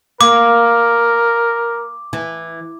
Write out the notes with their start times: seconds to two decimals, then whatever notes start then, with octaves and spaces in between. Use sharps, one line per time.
0.21 A#3 A#4 D6
2.13 E3